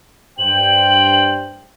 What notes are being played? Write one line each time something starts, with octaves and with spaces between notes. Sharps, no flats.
G2 C5 G5 F#7